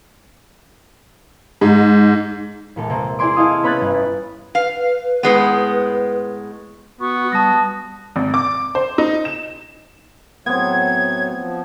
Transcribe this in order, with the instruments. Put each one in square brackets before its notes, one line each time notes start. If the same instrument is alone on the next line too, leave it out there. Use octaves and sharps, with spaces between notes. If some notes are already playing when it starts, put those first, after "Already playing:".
[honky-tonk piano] G#2
[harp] E1 A#1 A4
C3 A#3 C4
E4 G#4 D5 G#5 C6 D6
E4 G#4 A4 D#5 F5 D#6
B3 C#4 B5 F#6 G#6 A6
G1
[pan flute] B4 [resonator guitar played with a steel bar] F5
[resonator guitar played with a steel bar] A2 G#3 B3
[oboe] B3 [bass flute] F#4 [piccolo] C#6
[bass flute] G3 [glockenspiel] A5 D#6 [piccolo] A#6
[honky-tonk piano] G#1
D6
C5
D#4
E7
[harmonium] A2 F#3 [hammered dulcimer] B3 C4 [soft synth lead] G#6
[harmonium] F3